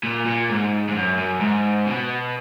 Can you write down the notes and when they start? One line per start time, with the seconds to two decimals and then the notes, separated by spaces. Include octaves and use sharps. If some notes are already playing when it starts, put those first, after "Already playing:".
0.03 A#2
0.26 A#2
0.49 G#2
0.88 G#2
0.95 F#2
1.17 F#2
1.41 G#2
1.86 B2